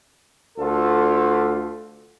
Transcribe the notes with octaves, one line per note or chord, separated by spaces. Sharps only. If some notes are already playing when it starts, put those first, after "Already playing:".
D2 F4 A4